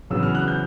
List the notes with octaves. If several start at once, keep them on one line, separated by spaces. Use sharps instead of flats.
E2 C#3 F#3 B3 E6
F6
F#6
G6